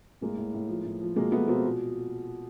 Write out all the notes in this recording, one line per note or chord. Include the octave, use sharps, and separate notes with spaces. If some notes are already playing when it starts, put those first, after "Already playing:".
A2 G#3 A#3
A2
A2
F3
A2
F3
B2 G#3 A#3
B2 A3 B3
B2 A#3 C4
A#2